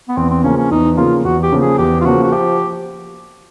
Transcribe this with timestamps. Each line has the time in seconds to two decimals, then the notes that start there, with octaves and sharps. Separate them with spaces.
0.09 B3
0.17 E2 C4
0.30 C4
0.44 C#3 F3 A#3 C#4
0.57 C#4
0.71 E2 D#4
0.97 C#3 F3 A#3 F4
1.24 E2 F#4
1.43 G4
1.52 C#3 F3 A#3
1.61 G#4
1.78 E2 G4
2.01 F4
2.05 C#3 F3 A#3 F#4
2.23 F#4
2.32 F3 G4